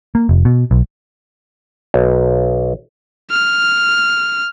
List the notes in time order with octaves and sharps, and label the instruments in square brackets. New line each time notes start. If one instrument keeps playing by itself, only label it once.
[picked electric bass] A#3
F1
B2
B1
[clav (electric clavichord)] B1
[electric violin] F6